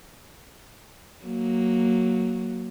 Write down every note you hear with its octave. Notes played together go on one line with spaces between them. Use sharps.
F#3 A#3